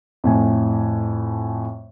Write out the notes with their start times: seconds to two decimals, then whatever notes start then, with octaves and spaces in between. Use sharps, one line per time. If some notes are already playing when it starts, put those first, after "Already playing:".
0.24 F2 A2 G#5